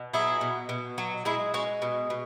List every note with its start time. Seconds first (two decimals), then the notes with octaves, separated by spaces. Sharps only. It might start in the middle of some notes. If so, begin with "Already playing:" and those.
Already playing: B2
0.13 F#3 E4 G#4
0.41 B2
0.69 B2
0.98 F#3
1.25 G#3 E4 G#4
1.54 G#3 C#4 F#4
1.82 B2
2.10 B2